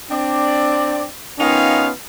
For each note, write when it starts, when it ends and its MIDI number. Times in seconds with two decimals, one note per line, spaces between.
0.11 1.04 60
0.11 1.04 62
0.11 1.04 74
1.39 1.90 51
1.39 1.90 59
1.39 1.90 61
1.39 1.90 63
1.39 1.90 65
1.39 1.90 77